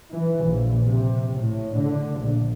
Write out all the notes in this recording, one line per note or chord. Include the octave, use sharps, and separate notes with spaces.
E3
A#1
C3
A2
D3
A#1